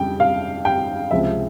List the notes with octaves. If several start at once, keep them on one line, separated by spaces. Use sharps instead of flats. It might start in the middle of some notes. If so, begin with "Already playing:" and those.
Already playing: F2 C#3 G3 G5
F5
G5
C#2 C3 F3 E5